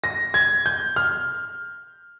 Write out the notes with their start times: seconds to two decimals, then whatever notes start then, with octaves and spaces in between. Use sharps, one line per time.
0.04 A#6
0.34 G#6
0.66 G6
0.96 F6